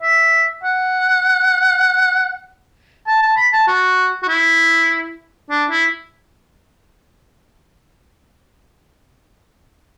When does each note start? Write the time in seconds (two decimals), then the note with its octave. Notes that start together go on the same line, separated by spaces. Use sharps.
0.02 E5
0.63 F#5
3.07 A5
3.22 A5
3.37 B5
3.53 A5
3.68 F#4
4.23 F#4
4.28 E4
5.50 D4
5.71 E4